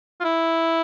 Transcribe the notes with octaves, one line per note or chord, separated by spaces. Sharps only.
F4
E4